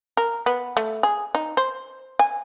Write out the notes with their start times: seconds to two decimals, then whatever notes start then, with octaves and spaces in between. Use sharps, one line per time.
0.17 A#4
0.46 B3
0.77 A3
1.03 G#4
1.35 D#4
1.57 C5
2.19 G#5